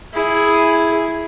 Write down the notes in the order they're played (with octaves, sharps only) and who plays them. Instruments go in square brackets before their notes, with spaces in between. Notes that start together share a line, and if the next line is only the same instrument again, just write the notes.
[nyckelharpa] E4 G#4